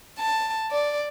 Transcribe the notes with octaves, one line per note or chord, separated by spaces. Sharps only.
A5
D5